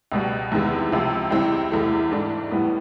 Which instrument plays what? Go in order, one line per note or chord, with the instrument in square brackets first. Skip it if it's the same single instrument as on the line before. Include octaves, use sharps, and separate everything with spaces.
[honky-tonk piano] C#2 B2 G3
E2 C3 D#3 G#3 B3
C#2 C3 F3
C#2 C3 E3 G3 C4
E2 C3 E3 A3
G#2 E3 A3 D4
A2 E3 G3 B3